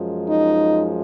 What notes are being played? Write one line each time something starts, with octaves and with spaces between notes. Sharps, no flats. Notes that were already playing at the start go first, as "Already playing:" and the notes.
Already playing: F#2 F3 G#3
D#4